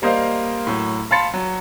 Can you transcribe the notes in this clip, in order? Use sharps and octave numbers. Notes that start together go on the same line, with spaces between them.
G3 A#3 C5 D#5 F5
A2 F#3
F5 A5 B5 C6 A6 C#7
F#3